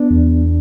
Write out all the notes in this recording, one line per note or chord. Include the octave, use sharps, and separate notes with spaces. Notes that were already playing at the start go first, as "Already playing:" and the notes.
Already playing: B3 D4
E2